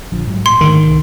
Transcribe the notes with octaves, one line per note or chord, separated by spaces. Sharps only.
A#1 D3 F3
G#2 F#3
A#2 C6
G#2 D3 D#3 A3
C2